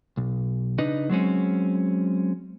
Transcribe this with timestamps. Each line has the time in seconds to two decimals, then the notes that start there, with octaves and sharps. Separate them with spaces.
0.17 B1
0.78 C#3 D4 D#4 B4 D#5
1.10 F#3 G#3 C4 C#4